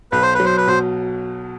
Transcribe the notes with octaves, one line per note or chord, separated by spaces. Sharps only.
B1 B4
C5
B4
F#3
C5
B4
B2 C5